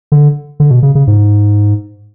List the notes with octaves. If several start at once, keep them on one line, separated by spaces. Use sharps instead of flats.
D3
D3
B2
C#3
C#3
G#2